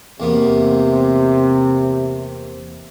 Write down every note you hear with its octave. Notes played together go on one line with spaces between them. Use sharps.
E2 C3 A#3 B3